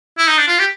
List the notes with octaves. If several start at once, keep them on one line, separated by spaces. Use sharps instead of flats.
E4
D#4
D4
F4
G4